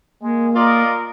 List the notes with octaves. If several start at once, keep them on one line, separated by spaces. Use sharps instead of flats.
G#3 A#3
F4 A#4 D5 D#5